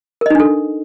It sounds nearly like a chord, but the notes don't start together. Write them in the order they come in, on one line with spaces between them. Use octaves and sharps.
A#4 D#5 D#4 D4 A4